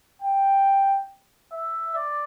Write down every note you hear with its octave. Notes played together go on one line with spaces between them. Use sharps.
G5
E5
D5